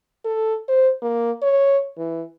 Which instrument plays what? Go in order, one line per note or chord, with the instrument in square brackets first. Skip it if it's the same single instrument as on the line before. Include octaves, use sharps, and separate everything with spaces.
[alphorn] A4
C5
A#3
C#5
E3